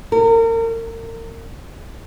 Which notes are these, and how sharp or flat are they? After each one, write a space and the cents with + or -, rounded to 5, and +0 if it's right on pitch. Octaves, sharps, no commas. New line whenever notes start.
A#4 -35